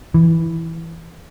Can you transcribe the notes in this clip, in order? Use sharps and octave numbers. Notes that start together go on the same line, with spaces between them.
E3